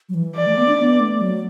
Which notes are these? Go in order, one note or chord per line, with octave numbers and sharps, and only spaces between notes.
F#3
E3
E3 D5
A3
B3
D4
B3
A3
F#3